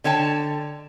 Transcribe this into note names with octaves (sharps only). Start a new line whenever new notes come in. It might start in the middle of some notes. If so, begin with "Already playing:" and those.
D3 C#5 G5 A5